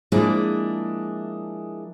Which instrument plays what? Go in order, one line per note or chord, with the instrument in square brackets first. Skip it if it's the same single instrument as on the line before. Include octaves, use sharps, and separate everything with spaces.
[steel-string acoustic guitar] F3 G#3 A#3 D4 E4 G#4